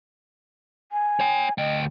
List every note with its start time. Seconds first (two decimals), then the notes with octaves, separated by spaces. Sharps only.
0.92 G#5
1.20 C#5 G5
1.58 D2 D#5 G5